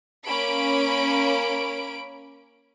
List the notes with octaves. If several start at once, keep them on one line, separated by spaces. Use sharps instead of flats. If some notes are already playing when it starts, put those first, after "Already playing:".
A#3 C#4 B5 D7